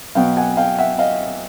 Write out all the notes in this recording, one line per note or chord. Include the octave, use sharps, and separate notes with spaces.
B2 F#3 B3 F5 G5
F#5 G#5
F5 G5
E5 F#5
D#5 F5